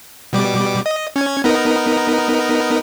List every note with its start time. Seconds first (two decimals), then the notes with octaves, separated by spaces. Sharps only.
0.33 B2 G3 D6
0.86 D#5
1.16 C#4 G#6
1.44 B3 D#4 A#4